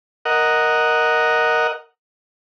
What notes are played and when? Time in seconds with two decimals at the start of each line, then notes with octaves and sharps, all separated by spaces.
0.25 A#4 D#5 F#5